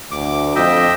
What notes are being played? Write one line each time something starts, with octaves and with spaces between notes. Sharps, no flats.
D2 D6
F2 D#5 E5 G5